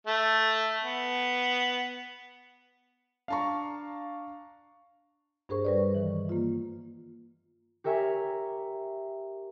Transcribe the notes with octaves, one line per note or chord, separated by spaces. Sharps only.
A3
B3
D4 F5 A5 A#5 C#6
G2 D4 G#4 A#4 C5 C#6
G3 B4 D5
D#3 E3
A#3 F4
G4 A#4 C#5 E5 G#5